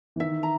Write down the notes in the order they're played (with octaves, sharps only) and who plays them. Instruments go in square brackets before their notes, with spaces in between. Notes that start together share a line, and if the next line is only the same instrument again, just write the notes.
[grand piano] E3
[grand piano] D#3 [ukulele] E5
[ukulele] A#5